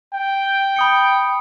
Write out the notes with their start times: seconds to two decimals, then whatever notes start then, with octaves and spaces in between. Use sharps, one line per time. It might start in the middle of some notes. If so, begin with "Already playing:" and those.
0.14 G5
0.76 B5 D#6 C#7